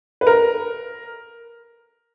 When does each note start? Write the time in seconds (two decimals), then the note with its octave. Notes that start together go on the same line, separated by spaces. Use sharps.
0.21 B4
0.27 A#4